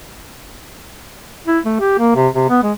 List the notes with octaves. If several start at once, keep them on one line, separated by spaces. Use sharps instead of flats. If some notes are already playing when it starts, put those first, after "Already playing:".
E4
A3
G4
A#3
C3
C3
B3
G#3